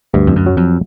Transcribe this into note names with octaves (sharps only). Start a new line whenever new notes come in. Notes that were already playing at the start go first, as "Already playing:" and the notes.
D2 G2
F2
F#2
F#3
F2